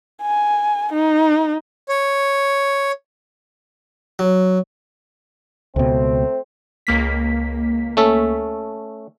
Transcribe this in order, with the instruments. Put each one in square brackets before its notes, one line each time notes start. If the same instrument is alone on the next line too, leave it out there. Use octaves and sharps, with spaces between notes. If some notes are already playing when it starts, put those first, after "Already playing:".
[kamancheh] G#5
D#4
[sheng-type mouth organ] C#5
[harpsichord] F#3
[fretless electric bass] C#2 B2 [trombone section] A3 C4
[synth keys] C#2 A#3 B6
[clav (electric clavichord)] A3 C#4 A4